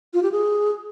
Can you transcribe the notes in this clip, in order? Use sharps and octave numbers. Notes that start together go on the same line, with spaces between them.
F4
G4
G#4